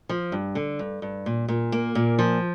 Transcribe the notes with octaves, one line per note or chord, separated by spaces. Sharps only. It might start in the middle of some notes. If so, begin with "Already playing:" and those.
F3
G2
D3
G2
G2
A#2
A#2
A#3
A#2
F3